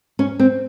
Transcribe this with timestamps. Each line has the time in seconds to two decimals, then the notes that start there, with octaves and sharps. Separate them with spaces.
0.19 C#4
0.39 C4